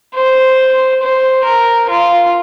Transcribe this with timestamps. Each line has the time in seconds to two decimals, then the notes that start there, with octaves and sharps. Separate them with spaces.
0.15 C5
1.03 C5
1.45 A#4
1.89 F4